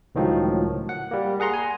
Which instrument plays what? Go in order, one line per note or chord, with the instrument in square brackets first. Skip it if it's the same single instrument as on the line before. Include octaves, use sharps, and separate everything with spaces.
[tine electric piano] C#2 A2 D#3 F3 F#3
F#5
G3 A#3
G#4 F#5 A#5 C6
G#5